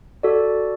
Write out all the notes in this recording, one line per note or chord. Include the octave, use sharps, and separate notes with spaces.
F#4 A4 D5